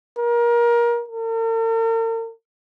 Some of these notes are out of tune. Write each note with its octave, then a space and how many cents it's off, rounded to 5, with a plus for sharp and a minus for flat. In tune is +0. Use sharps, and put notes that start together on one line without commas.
A#4 +25
A#4 -45